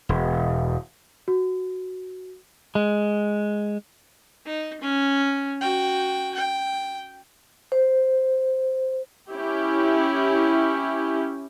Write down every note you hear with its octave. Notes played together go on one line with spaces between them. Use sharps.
E1
F#4
G#3
D#4
C#4
F#4 G5
G5
C5
C#4 E4 G4